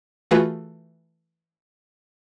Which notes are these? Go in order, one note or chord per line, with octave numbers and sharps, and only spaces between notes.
E3 A3 F4 F#4 G#4 B4